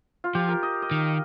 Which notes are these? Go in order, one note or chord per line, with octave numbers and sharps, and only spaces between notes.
F4
F3 G4
A#4
D#5
D#5
D#3